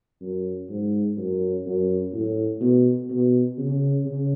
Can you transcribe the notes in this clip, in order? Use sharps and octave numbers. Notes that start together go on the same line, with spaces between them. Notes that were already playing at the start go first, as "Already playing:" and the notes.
F#2
G#2
F#2
F#2
A2
B2
B2
C#3
C#3